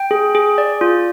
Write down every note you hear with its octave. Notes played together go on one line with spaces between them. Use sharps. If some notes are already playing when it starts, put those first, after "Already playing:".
Already playing: G5
G#4
G#4
D5
F4